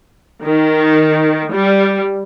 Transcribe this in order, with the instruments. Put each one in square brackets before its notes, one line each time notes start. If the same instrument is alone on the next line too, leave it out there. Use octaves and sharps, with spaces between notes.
[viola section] D#3
G3